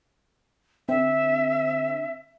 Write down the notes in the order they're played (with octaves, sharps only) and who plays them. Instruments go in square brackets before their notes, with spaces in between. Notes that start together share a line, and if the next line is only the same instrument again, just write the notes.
[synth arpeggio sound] D3 C4 [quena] E5